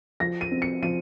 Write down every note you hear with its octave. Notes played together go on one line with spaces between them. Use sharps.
F3 A#6
D#7
C4
C#7
F3 D#7